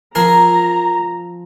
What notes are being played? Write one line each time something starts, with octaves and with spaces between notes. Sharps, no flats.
F3 C4 G#4 A#4 A#5